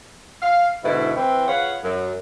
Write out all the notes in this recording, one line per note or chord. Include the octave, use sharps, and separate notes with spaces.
F5
G#2 B2 D3 E4
E3 C4
F4 G#4 B4 C#5 F5 F#5
F#2